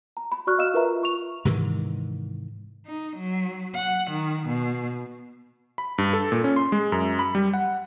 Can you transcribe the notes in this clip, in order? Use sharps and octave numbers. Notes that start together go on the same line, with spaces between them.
A#5
B5
F#4 D5 C#6 F6 F#6
D#5 F5 E6 F6 E7
F4 A#4 B4 E5 A#5
F4 C#6 F7
G#2 C3 D#3 E3
D#4
F#3
F#5
D#3
B2
B5
G2
A4
A#2
C#4
C6
G#3
F#2
B5
G3
F#5